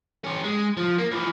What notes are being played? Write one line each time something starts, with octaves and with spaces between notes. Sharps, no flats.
C#4 G4
G#3
F3
A#3
E3 F3